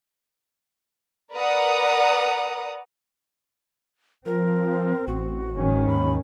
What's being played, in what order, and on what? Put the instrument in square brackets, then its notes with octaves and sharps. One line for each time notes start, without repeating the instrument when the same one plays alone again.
[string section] A#4 B4 D5 F#5 A#5 D#6
[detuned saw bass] F3 [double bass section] C4 [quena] A#4
[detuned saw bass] A1 [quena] F#4
[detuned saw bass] F#1 [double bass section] G#2 D#3 C#4
[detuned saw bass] D#2 [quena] B5